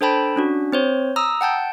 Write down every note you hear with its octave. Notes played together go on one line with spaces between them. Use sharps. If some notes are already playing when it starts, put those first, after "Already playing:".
D4 A4 C5 G5 A5 B5
C#4 D4 F#4
C4 C5 C#5
A#5 D#6 E6
F#5 G5 A5 G6